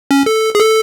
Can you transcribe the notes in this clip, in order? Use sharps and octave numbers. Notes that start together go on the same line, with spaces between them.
C#4
A4
G#4
A4